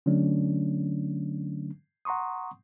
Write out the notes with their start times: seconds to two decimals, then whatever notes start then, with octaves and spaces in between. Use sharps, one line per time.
0.06 D3 F#3 A3 C#4 D4
2.05 F#5 A#5 C6 C#6 D#6